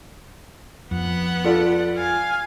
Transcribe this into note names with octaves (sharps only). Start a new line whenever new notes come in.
F2 B3 F#5
F4 A4 D5
F5 G#5